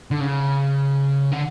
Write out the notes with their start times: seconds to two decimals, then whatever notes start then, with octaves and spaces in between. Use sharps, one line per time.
0.11 D3
0.21 C#3
1.32 D3